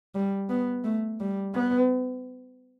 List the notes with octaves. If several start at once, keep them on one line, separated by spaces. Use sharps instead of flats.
G3
B3
A3
G3
B3